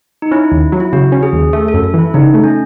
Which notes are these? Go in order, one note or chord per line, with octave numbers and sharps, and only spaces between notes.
D#4
C#4 E4
D#2
F#3
E4
C#3 F#4
C#4
G#4
D#2
A3 A4
A4
F#2
A4
E3 E4
C#3 D#4
A3
C#4